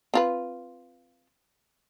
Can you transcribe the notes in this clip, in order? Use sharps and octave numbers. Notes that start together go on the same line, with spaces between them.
C4 F4 B4